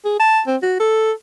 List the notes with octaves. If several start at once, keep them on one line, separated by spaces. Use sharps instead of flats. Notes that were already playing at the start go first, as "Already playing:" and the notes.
G#4
A5
C4
F#4
A4